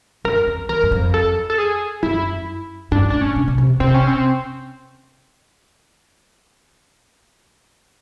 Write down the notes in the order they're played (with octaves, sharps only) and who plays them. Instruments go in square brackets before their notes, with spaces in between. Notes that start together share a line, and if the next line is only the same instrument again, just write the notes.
[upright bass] F#2 [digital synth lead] A#4
[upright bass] F2
[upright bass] E2 [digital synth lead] A#4
[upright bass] F#2
F2
[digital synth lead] A4
A4
G#4
[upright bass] F#2 [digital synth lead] E4
[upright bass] G2 [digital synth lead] D4
[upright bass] A2 [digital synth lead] D4
[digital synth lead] C#4
[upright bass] A#2
B2
C3
[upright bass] C3 [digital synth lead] C4
[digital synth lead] C#4
C4